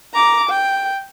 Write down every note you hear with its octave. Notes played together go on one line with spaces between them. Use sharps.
A#5 D6
G5